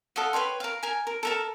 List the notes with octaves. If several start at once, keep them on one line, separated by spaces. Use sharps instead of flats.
A4 D#5 F5 F#5
B4 C#5 G5 C6
A#4 F5
A#4 G#5
A#4
A4 A#4 A5